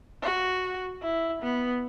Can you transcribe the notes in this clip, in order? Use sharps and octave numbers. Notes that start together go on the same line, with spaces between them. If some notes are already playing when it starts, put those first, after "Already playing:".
F#4
E4
B3